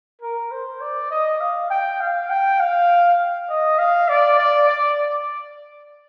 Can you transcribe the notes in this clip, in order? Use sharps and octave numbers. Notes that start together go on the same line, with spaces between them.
A#4
C5
D5
D#5
F5
G5
F5
G5
F5
D#5
F5
D5
D5
D5